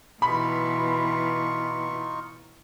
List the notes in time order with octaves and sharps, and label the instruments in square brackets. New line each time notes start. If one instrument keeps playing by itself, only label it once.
[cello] B2 E3 [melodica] D#4 F4 C#6 [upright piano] B5